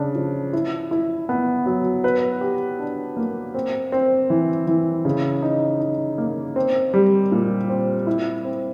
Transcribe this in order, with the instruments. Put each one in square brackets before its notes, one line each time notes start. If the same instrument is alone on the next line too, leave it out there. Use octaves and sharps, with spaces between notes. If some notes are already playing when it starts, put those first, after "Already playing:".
Already playing: [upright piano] C#3 D4
F3
E4
E4
B3
F#3
B4
G4
D4
A#3
C4
C4
E3
E3
C#3
D#4
D#4
A#3
C4
G3
A#2
C4
E4
C4